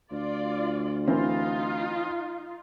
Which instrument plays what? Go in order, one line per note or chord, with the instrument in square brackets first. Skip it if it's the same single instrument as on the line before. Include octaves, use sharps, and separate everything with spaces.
[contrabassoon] D2 [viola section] F4 D5
[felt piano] E3 C4 A#4 [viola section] D#4 F4